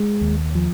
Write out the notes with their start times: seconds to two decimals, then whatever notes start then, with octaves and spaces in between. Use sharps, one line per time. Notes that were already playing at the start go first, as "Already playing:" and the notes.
Already playing: G#3
0.21 D#2
0.55 F3